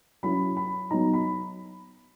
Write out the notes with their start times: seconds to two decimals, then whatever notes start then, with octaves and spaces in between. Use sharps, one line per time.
0.23 F#3 C#4 E4 B5
0.57 B5
0.91 F#3 B3 D#4 A#5
1.13 B5